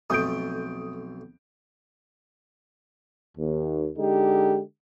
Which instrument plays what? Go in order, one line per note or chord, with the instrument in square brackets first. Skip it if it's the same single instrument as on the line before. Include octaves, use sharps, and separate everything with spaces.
[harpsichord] B1 F2 A3 [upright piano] D#6 G6 D7
[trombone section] D#2
D3 G#3 D#4 G4